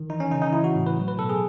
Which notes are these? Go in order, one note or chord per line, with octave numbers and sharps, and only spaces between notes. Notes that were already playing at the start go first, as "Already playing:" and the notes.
Already playing: D#3
E3 D#4
C#4
C#3 D#4
D#4
E3 E4
F#4
A2
B4
F#3
B4
B2 A4
G#4